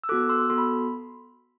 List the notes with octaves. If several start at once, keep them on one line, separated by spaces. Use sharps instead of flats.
E6
B3 F#4 A4 D6 F#6
C6 E6
B3 F#4 A4 C6
B5